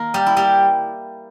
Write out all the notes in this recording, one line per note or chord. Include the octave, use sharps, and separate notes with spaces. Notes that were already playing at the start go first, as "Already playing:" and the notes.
Already playing: D#3 A#3 A#4
G3 G4
E4
G3 G4